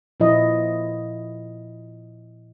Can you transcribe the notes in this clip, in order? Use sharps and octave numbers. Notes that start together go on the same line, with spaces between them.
A#2 F3 E4 D#5